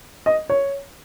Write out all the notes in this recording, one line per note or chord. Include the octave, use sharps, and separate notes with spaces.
D#5
C#5